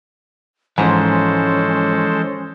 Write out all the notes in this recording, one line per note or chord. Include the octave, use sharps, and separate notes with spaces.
G#2 E3 F3 G#3 C#4 A4 C5